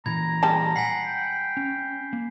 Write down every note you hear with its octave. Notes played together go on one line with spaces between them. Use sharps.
A#2 E3 A#5 B5 G#6
G3 G#3 A5
F#5 G#5 B6 C7
G5
C#4
A#3